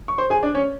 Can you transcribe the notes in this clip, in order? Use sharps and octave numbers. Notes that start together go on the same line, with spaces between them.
C#6
C5 C6
G#4 G#5
D4 D5
C#4 C#5